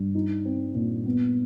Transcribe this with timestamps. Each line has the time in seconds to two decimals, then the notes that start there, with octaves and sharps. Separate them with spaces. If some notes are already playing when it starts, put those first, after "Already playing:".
Already playing: G2
0.15 D#4
0.45 C4
0.75 A#2
1.06 B3